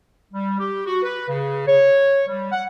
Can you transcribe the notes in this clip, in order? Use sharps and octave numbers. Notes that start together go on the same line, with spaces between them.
G3
G4
F#4
B4
C#3
C#5
G3
F#5